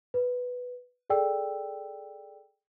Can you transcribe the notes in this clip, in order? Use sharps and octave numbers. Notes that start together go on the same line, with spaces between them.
B4
G#4 A4 D5 G5 E6